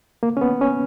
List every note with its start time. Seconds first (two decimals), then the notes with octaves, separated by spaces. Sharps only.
0.23 A#3
0.37 C#4
0.41 B3
0.61 C#4